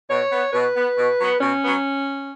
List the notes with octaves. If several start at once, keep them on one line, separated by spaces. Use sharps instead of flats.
B2 C#5
B3
B2 B4
B3
B2
F#3 B3
B2 C#4
F#3 B3